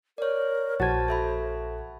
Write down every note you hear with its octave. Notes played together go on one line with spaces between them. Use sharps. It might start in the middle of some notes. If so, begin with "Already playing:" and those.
A#4 C#5 D5
A#1 F#4 C5 A5 G#6 A6
A4 E5 B5